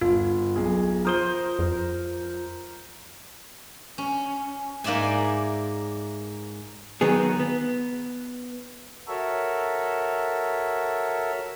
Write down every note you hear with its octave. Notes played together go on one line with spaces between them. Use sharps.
G1 F4
B1 G#4
F3 A#4 C5 D#6 G7
F2
C#4
G#2 A#3 D5 E5 G#5
D#3 F#3 B3 G#4
B3
F#4 A4 A#4 C#5 E5